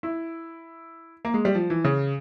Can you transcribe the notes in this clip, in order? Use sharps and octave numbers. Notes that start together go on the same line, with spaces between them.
E4
A#3
G#3
G3
F3
E3
C#3